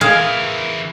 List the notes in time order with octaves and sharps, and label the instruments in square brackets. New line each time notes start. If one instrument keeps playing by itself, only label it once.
[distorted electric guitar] E3 A#4 [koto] G#4 F5